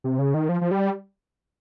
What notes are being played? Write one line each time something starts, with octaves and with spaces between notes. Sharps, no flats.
C3
C#3
D#3
F3
F3
G3